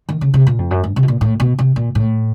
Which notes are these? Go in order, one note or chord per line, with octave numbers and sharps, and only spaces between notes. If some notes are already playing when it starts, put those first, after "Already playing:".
D#3
C#3
C3
A#2
F2
F#2
G2
C3
B2
A#2
A2
B2
C3
A#2
A2